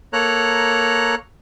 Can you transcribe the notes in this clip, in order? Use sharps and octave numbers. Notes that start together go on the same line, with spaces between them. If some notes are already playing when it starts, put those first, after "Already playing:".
A#3 A4 C#5 A#5 F#6